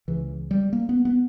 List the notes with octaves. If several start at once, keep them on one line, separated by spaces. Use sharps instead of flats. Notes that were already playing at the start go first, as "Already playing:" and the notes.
C#2 C#3 E3
G3
A#3
B3
B3